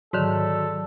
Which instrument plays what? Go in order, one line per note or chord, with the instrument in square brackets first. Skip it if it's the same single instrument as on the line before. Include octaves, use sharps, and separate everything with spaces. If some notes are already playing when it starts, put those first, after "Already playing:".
[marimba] G#2 D3 D#3 [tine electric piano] F#3 [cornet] A4